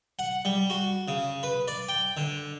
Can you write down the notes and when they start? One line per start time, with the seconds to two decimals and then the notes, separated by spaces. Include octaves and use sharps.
0.19 F#5
0.45 G3
0.70 F#4
1.08 C#3
1.43 B4
1.68 D5
1.89 G5
2.17 D3